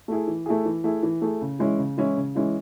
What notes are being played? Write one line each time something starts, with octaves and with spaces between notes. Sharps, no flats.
A3 E4 G#4
E3
A3 E4 G#4
E3
A3 E4 G#4
E3
A3 E4 G#4
C#3
E3 G#3 C#4 E4
C#3
E3 G#3 C#4 E4
C#3
E3 G#3 C#4 E4